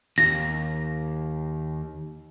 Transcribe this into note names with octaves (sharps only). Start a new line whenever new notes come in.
D#2 A#6